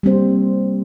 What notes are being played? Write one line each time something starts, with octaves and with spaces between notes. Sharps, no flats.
G3 A#3 C4 C5